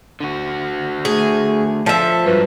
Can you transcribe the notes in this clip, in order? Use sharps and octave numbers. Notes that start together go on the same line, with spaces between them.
D3 F#4
A3 G#4
F3 A4 E5
G2 F#3 B4